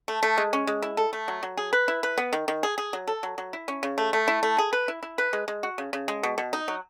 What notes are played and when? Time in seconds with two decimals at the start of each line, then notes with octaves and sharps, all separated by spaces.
0.08 A3
0.23 A3
0.38 G#3
0.53 C#4
0.67 G#3
0.82 E4
0.97 A4
1.13 A3
1.28 F#3
1.43 F#3
1.57 G#4
1.73 B4
1.88 E4
2.03 B4
2.18 B3
2.33 D#3
2.48 D#3
2.63 G#4
2.78 G#4
2.93 F#3
3.07 A4
3.23 F#3
3.38 F#3
3.53 E4
3.68 C#4
3.83 C#3
3.98 A3
4.13 A3
4.28 E4
4.43 A3
4.58 G#4
4.73 B4
4.88 E4
5.03 E4
5.18 B4
5.33 G#3
5.48 G#3
5.63 F#4
5.78 C#3
5.93 C#3
6.08 G#3
6.23 B2
6.38 B2
6.53 D#4
6.68 F#3